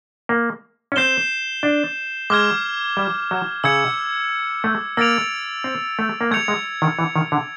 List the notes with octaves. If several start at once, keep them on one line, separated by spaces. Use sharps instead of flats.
A#3
C#4
C4 G6 C7 E7 G7
D4
G#3 D6 F6 G#6
G3
F#3
C#3 E6 G#6 C#7
A3
A#3 E6 A6 D7 F7
C4
A3
A#3
A3 G#6 C#7 F7
G#3
D#3
E3
D#3
D3